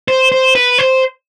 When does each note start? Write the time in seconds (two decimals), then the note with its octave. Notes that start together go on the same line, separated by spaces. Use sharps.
0.08 C5
0.32 C5
0.55 B4
0.78 C5